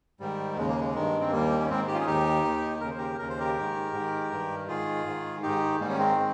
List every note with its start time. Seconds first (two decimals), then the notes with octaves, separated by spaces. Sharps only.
0.20 G#2 D#3 G3
0.57 D#2 C#3 G#3
0.69 A#3
0.81 G#3
0.95 G2 D#3
1.20 C4
1.32 D#2 D#3 G3 A#3
1.60 C#4
1.69 G#2 D#3 G#3 C4
1.88 G4
1.94 C#4 F4
2.01 G#4
2.06 D#2 D#3 D#4 G4
2.45 D#2 D#3
2.81 D#2 C#3 A#4
2.91 C5
2.98 G4 A#4
3.19 D#2 C#3 A#4
3.29 C5
3.39 G4 A#4
3.56 G#2 D#3
3.93 G#2 D#3
4.31 G2 D#3
4.68 G#2 D#3 F4 G#4
5.06 G#2 D#3
5.43 G#2 D#3 D#4 G4
5.80 G#2 D#3 G3 A#3
5.90 C#4
5.99 G#3 C4
6.17 D#3